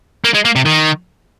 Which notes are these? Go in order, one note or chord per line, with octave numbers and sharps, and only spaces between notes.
A#3
G#3
A#3
C3
D#3